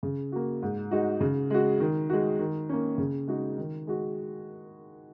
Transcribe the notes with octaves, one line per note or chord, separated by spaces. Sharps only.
C#3
A#3 F#4
G#2
G#3 D#4 F#4
C#3
G#3 F#4
D#3
G#3 F#4
D#3
A#3 C#4
C#3
G#3 D#4 F#4
D#3
G#3 F#4